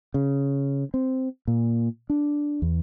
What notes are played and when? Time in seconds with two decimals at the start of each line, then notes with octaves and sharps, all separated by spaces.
0.14 C#3
0.94 C4
1.48 A#2
2.10 D4
2.62 E2